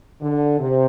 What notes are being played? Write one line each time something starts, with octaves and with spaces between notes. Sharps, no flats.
D3
C3